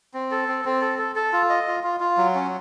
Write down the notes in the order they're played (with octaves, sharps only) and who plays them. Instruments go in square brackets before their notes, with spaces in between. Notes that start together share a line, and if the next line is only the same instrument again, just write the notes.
[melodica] C4
A4
C4
C4
A4
A4
A4
F4
D#5
F4
F4
F4
F#3
C#4